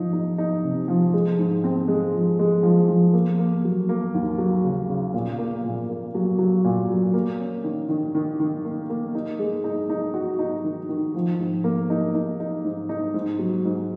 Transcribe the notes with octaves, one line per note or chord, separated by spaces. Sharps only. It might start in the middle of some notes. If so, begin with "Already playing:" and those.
Already playing: F3 D#4
D#4
D#4
C3
F3
G#3
G#2
C4
G#3
F3
G#3
F3
F3
A#3
A#3
F#3
A#3
D#2
F#3
C#3
C#3
A#2
A#3
A#2
A#3
F#3
F#3
A#2
F#3
A#3
C#4
D#3
D#3
D#3
D#3
A#3
A#3
D#4
G#3
D#4
D#4
F#4
D#4
D#3
D#3
F3
G#2
A#3
D#4
D#4
D#4
G#2
D#4
G#2
F#3
G#2